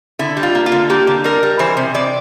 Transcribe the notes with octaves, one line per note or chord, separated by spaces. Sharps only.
D3 E4
G3
F4
A#3
F4
D3
A#3 G4
D3
G3 A#4
G3
E3 C5
C3
C3 D5